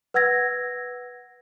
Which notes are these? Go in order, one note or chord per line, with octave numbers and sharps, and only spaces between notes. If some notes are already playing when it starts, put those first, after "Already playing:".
B4 F#5 E6 G#6 A#6